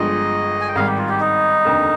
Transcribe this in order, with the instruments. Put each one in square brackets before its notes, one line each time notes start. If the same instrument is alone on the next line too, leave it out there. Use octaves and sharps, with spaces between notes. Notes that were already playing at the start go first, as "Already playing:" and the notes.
Already playing: [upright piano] G1 G2 F3 G#3 [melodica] D#5
[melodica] G#5
G5
[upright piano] G#1 G#2 D#3 G3 [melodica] F5
[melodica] G4
F4
G4
D#4
[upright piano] F1 D#2 D3